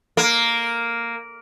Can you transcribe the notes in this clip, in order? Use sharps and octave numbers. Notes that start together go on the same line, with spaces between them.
A#3